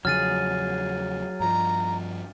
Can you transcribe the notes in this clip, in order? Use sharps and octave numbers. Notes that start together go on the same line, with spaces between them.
E2 C#3 F3 F#3 G#4 F6 A6 D#7
G2 F3 A#5